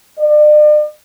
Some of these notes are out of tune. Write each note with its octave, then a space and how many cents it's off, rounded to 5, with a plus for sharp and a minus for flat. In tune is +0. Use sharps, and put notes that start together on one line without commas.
D5 +40